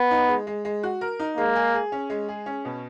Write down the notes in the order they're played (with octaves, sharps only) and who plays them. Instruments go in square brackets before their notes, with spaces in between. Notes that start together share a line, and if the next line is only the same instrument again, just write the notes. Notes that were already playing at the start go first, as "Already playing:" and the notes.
Already playing: [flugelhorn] B3
[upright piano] D#4
G#3
G#3
G#3
F#4
A#4
D#4
[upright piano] G#3 [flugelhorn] A#3
[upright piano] G#4
G#4
C#4
G#3
G#4
C#4
B2